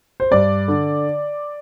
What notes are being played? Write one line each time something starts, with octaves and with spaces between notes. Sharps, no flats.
C5
G2 D5
D3